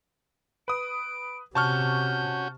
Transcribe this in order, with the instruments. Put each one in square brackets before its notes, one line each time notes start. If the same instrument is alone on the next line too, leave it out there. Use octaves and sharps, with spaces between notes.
[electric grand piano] B4 D#6 [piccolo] D7
[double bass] C3 [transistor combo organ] C#4 F#4 [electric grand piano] A5 C#6 F6 [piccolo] G6